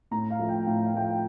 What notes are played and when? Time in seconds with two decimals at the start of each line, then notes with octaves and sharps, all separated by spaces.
0.11 A2 A#5
0.30 F5
0.39 F3 A3
0.49 G5
0.66 A2 F5
0.84 F5
0.94 F3 A3 G5
1.03 F5